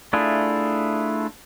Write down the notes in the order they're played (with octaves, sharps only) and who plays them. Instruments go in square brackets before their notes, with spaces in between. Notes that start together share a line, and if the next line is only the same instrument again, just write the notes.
[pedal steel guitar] A3 D4 E4 F4 G#4